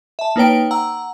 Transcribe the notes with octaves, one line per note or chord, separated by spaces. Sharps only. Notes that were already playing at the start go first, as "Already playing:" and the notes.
E5 A5
A#3 D#4 B4 C#5 G5 D7
F#5 A#5 E6